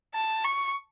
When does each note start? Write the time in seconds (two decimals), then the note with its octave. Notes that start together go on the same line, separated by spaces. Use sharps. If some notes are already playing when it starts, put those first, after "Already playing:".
0.15 A5
0.44 C#6